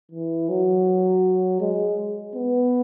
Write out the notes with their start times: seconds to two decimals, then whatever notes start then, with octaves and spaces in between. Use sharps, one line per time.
0.11 E3
0.49 F#3
1.60 G#3
2.35 B3